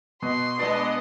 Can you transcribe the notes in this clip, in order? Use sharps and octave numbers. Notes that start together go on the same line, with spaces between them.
B2 D#5 C6
G#3 B3 D4 D5 D#5